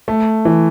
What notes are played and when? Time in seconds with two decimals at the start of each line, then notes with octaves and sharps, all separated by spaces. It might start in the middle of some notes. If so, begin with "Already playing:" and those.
0.08 A3
0.45 E3